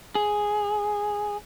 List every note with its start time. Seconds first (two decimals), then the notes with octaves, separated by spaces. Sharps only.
0.15 G#4